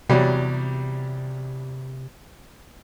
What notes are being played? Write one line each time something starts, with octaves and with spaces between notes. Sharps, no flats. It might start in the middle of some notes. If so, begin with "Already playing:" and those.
E2 C3 F#3 G3